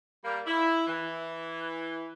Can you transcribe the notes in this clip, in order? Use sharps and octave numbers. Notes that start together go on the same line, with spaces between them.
G3 A#3
E4
E3